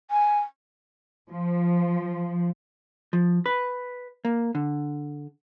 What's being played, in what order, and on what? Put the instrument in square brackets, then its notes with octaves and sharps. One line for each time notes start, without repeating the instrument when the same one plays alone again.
[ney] G#5
[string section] F3
[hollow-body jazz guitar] F3
B4
A#3
D3